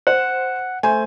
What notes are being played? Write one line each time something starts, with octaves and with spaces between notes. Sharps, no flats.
C5 F#5
A3 C5 G#5